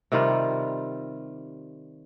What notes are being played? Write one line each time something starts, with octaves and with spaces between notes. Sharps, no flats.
C3 D#3 G3 F4